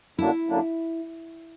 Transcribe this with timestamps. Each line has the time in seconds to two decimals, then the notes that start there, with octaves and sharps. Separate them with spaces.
0.18 F#2 D3 F#3 A#3 D4 E4
0.49 F#2 D3 F#3 A#3 D4